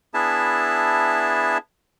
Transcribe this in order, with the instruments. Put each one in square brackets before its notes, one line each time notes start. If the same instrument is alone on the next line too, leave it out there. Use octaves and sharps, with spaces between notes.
[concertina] B3 D4 E4 G#4 E5 A5